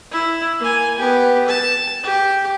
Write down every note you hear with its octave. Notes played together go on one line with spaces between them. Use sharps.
E4
A#3 G#5
B3 G4
A5
G4